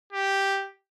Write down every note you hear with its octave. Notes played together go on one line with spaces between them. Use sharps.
G4